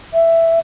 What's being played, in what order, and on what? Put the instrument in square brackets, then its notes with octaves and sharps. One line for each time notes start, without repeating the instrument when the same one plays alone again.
[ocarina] E5